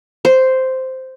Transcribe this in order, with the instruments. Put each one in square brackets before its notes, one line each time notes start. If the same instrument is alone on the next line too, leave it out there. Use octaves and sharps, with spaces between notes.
[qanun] C5